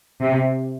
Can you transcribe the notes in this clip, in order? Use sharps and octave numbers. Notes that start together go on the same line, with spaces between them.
C3